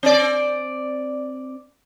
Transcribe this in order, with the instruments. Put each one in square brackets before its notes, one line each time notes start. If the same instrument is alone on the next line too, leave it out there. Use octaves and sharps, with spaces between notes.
[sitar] C4 D5